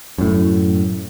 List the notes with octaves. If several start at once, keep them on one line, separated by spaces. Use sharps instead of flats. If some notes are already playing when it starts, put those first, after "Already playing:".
F#2 A2